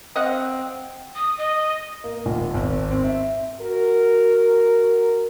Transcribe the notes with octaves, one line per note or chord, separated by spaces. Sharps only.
C4 D#5 F5 F#5
D#6
D#5
A#3
D#1
G#1
C4
E5
F#4 A#4